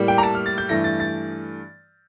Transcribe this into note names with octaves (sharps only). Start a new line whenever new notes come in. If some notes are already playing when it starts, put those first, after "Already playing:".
Already playing: A2 G3 A#3
G5
A#5
A5
F6
A6
G6
G2 E3 A3 A#6
A6
A6